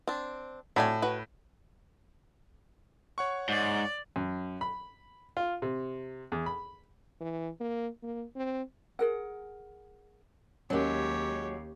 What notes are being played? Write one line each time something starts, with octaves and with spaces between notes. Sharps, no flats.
C4 D4
A2 F#4 D5 G#5
F#4 B4
C#5 F#5 C#6
G#2 D5
F#2
B5
F4
C3
E2
B5
E3
A#3
A#3
C4
G#4 A#4 F#5
D#2 F#3 G#3 C#4 G4 A#4 C#5